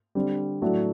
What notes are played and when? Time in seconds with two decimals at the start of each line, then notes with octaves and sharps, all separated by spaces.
0.15 D3 G3 C4
0.62 A2 F#3 A3 D4 F#4